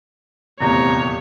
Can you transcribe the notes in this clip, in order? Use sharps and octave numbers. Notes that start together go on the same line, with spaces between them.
D#1 E2 C3 A3 C4 C#5 A#5